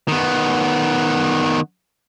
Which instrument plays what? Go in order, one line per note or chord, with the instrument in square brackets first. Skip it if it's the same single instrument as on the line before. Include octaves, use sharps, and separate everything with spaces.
[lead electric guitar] D#3 B3